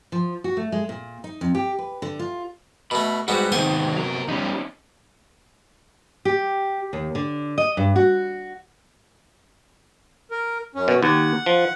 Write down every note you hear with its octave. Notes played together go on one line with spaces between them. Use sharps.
F3
F#4
A3
G#3
A#2
D#4
F2
G4
B4
D3
F4
B2 A3 B5
G#2 G3 B3 F#4
G#2 C3 D#3 B3 C5 G#5 C6
F#3 A#4
E2 G3 C#4 D#4
G4
D#2
D3
D#5
G2
F#4
A#4
F#2 C#4
B2
D#2 F#5
F3